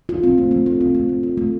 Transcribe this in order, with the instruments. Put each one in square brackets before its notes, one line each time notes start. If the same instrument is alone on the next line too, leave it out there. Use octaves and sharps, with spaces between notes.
[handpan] F4
C4
A3
A3
F4
C4
A3
A3
F4
A3